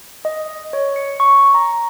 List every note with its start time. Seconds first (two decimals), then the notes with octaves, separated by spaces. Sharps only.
0.25 D#5
0.73 C#5
0.96 C#7
1.20 C#6
1.54 A#5